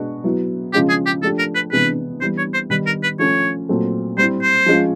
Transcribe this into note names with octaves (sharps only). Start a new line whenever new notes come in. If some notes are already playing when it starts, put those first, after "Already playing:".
Already playing: B2 G#3 B3 D4 F#4
F#3 B3 E4
C#3 F3 G#3 C#4 F4 G4
G#4
G4
F3 A3 D4 G4 A4
A#4
B4
C3 E3 G#3 B3 D4 B4
E3 G3 B3 E4 C5
C#5
C5
D#3 G3 B3 B4
A#4
B4
F3 A3 C#4 C#5
A#2 F#3 A3 C4
G3 C4 E4 C5
C5
F3 G#3 C#4 F4